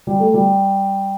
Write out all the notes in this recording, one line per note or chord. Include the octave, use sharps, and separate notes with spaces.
G3
A3
G3